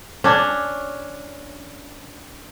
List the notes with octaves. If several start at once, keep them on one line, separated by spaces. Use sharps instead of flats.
C#4 D4